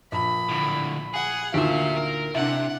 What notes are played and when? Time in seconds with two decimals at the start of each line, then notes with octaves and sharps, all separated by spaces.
0.12 A#1 B5
0.49 D2 A2
1.14 G#4 F#5
1.54 D2 A#2 D#3 G4 E5 F5
1.97 A#4
2.34 C3 D4 E4 F#5